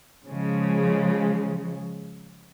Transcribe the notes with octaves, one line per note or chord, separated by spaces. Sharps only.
C#3 F3 G#3